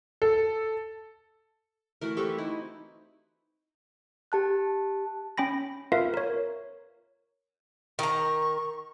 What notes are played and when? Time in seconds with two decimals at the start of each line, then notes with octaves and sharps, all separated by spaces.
0.22 A4
2.01 E3 A3 F#4 A#4
2.17 C4 G4 A4 B4 C#6
2.38 D#4 E4
4.32 G4 A5 F#6
5.38 C#4 G5 B5 A#6
5.92 F4 A#4 B4 E5 F5
6.14 A#4 C#5
7.99 D#3 A#5 C#6